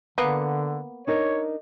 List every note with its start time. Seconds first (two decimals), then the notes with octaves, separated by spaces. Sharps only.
0.18 D3 A#3 B3
1.07 D4 D#4 A#4 C#5